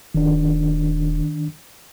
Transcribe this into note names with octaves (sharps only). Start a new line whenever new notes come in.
D#1 D#3 D4